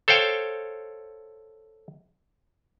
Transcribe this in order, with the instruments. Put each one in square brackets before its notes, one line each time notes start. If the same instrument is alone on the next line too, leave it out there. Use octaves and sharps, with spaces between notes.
[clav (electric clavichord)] A4 C5 C#5 F5 G5